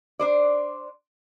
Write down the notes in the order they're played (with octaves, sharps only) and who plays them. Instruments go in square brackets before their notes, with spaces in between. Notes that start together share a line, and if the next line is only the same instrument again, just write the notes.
[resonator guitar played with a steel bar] D4 C5 D5